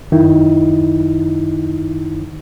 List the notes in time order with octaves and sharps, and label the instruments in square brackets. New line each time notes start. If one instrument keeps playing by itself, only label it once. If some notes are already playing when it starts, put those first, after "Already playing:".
[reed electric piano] F#2 D#3 D#4 E4